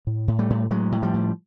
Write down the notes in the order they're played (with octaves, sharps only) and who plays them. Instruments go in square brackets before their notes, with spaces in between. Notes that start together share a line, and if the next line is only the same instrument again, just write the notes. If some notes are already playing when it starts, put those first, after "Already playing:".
[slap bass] A2
A2
G3 A3
A2
A2 F#3 G#3
A2
F3 G3
A2